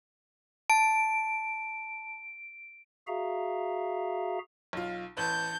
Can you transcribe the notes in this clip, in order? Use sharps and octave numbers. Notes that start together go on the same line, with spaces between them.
A5 D7
F#4 G#4 E5 F5 A#5
B1 F4
A1 B4 A5 G6